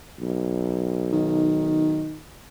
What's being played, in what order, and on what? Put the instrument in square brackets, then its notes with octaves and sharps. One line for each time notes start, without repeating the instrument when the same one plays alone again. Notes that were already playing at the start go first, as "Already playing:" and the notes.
[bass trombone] B1
[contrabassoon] D#3